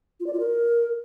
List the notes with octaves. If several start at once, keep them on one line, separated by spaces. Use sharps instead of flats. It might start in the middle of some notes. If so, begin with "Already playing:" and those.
F4
D5
F4
A#4